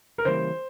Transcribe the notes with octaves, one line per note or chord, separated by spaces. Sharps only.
A#4
C#3 E3 G3 A#3 C5